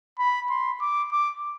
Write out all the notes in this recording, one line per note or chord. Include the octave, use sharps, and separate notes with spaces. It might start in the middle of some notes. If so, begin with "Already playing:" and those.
B5
C6
D6
D6